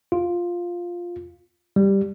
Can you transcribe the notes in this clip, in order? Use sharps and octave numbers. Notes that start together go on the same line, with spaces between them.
F4
G3